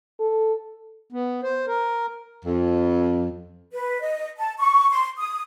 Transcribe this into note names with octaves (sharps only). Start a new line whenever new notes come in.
A4
B3
C5
A#4
F2
B4
D#5
A5
C#6
C6
D#6